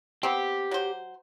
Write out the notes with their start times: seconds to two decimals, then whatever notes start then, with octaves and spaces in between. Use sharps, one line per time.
0.23 B3 C4 G4
0.71 F#3 C5